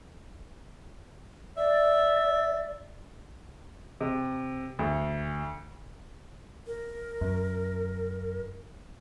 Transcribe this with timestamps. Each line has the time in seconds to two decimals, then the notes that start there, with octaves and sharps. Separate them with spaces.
1.57 D5 E5
4.01 C3
4.79 D2
6.67 A#4
7.21 F#2